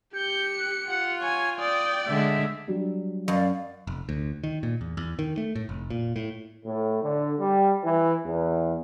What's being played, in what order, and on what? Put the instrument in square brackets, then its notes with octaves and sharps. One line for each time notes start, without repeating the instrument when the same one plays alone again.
[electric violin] G4 C#7 [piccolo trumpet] G6
[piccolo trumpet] F#6
[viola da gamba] F4 [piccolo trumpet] F#5
[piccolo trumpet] C#5 [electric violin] G#5
[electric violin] D5 G5 [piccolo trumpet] D#6
[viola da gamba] D3 G#3 [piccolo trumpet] E5
[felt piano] F#3 G3 D4
[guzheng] F#2 [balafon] F#3 [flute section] D5 F5
[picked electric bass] F1
D2
D#3
A#2
E2
E2
D#3
A3
A2
F1
A#2
A2
[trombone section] A2
D3
G3
E3
E2